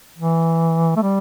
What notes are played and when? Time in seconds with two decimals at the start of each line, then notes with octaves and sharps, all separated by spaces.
0.18 E3
0.96 A3
1.03 G3